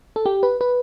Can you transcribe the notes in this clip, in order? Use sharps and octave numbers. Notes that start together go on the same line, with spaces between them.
A4
G4
B4
B4